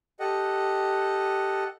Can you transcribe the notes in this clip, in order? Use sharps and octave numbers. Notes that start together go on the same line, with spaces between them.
G4 A4 D#5 F#5